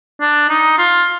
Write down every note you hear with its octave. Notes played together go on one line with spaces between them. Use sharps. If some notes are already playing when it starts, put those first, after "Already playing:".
D4
D#4
F4